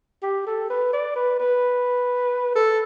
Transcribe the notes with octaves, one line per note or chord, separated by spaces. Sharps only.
G4
A4
B4
D5
B4
B4
A4